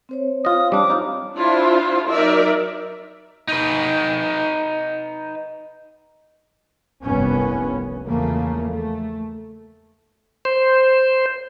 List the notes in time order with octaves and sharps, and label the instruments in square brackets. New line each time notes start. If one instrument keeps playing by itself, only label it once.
[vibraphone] C4 C5 C#5
[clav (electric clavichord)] F4 D#5 [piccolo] D#6
[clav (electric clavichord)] G3 D4 [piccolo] D6
[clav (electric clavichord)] D#4 F4
[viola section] D4 E4 F4 C5
F#3 D#4 A#4 D5 E5
[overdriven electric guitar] D#4 B4
[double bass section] F1 C2 G2 B3 C#4
E2 C#3 F3 A3 A#3
A3
[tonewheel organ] C5